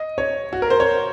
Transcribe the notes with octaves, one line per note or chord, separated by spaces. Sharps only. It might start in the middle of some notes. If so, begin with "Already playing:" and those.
Already playing: D#5
C#5
F#4
A#4
C5
C#5